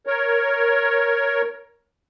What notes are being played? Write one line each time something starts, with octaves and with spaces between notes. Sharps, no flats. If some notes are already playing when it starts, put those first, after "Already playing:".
A#4 C#5